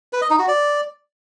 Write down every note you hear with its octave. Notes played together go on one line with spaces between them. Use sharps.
B4
D#5
D#4
F#4
D5